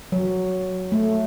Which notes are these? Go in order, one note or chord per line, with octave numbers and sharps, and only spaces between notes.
F#3
A3